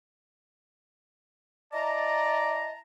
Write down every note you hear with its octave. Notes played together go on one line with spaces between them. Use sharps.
E4 D5 D#5 A5 A#5